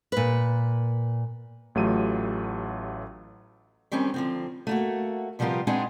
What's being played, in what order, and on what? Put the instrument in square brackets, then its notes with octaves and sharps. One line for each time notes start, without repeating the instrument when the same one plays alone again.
[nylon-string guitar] A#2 B4
[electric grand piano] A1 F#3 A3 F4 G4 D#7
[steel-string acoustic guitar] D#3 G3 C4 C#4 G#4
D3 F3 C4
A3 A#3 F#4
C3 F3 G3 B3 F4 A#4
G#3 B3 C4 D4 D#4 G#4